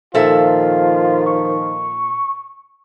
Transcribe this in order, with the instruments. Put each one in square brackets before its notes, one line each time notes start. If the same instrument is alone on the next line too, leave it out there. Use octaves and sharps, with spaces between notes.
[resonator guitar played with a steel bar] A#2 A4 E5 [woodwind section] D#3 F3 [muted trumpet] F4
[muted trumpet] C#6